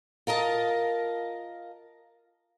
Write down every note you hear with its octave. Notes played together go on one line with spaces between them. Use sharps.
F4 A#4 D#5 A5